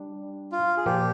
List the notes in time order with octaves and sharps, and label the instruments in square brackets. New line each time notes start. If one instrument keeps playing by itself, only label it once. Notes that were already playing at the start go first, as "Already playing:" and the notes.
Already playing: [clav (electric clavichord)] G3 D4
[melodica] F4
G#4
[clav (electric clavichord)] A#2 F3 A#3 [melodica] G4